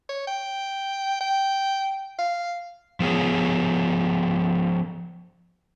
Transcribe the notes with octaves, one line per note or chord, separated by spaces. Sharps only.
C#5
G5
G5
F5
F3 B3 G#4 C#5